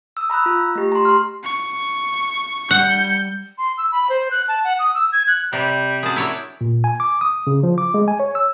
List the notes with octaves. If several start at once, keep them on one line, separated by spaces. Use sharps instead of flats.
D#6 E6
A#5 B5 E6 F#6
F4
A3 G4
A#5 C6
C6 F6
C#6
G3 F#5 G6 C#7
C6
E6
B5
C5
F#6
A5
F#5
D#6
E6
G#6
F#6
C3 G3
F#2 G#4 A5
E4 C#5 D5
A#2
G#5
D6
D#6
C#3
F3
D6
G#3
G#5
C#5
E6